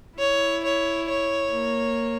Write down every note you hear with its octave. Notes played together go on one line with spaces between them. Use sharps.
E4 C#5
C#5
C#5
A#3